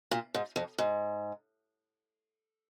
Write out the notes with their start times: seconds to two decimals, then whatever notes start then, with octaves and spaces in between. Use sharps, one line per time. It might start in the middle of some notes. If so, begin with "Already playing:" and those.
0.11 A#2
0.34 G#2
0.56 F2
0.78 G#2